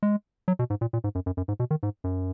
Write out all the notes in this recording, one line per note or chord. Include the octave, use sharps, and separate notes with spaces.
G#3
F#3
B2
G#2
A#2
A#2
G#2
F#2
F#2
F#2
G#2
B2
D#3
G#2
F#2